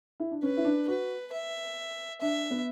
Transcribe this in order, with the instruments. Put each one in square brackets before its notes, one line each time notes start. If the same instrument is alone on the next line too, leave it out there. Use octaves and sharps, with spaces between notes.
[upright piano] E4
D4
[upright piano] C#4 [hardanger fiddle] B4
[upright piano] E4
D4
[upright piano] F#4 [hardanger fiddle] B4
[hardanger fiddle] E5
[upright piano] D4 [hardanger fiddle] E5
[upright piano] B3